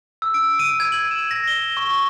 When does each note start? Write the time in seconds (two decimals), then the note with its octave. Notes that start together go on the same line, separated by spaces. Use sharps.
0.22 E6
0.34 D7
0.59 D#7
0.80 G#6
0.92 F#7
1.11 E7
1.31 A#6
1.48 G7
1.77 C#6